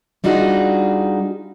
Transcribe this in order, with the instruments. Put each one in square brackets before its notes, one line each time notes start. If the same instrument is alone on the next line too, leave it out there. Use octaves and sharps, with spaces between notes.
[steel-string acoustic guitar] G3 D4 D#4 F4 F#4 G#4